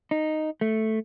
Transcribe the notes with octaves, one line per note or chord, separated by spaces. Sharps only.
D#4
A3